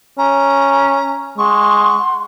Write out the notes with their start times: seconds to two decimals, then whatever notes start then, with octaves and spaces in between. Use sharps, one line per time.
0.19 C#4 A#5
1.38 G#3 F#5 C6 C#6